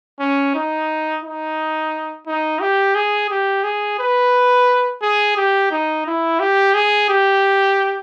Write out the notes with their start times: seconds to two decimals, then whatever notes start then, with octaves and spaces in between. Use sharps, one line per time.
0.20 C#4
0.55 D#4
1.24 D#4
2.27 D#4
2.61 G4
2.95 G#4
3.30 G4
3.64 G#4
3.99 B4
5.02 G#4
5.37 G4
5.71 D#4
6.07 E4
6.40 G4
6.74 G#4
7.09 G4